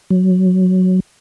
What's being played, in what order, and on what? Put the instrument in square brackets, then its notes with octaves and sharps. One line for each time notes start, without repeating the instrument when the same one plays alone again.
[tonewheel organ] F#3